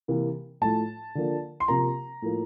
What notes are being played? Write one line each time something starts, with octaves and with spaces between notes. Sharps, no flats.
C3 E3 A#3
A2 F3 A3 A5
D3 F3 A#3
C6
C3 F3 A#3 A#5
A2 F3 A#3